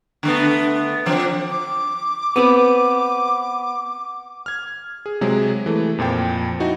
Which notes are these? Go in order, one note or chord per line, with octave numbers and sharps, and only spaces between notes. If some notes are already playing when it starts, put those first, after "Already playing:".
D3 A3 B3
D3 F3 C4
D6
B3 C4 B4
F6 G#6
G#4
C3 F#3 G#3 G#4
E3 A3
F2 A#2 F3 G5
D#4 E4 F#4